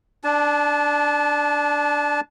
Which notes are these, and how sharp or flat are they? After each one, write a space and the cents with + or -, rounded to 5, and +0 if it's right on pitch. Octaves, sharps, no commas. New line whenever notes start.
D4 +0 A5 -25